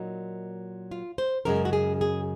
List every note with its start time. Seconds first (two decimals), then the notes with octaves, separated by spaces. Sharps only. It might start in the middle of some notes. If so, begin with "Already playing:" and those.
Already playing: A#2 F#3 A#3 D#4
0.91 F4
1.18 C5
1.45 F#2 C#3 G#3 A#4
1.65 F#4
1.73 G#4
2.01 G#4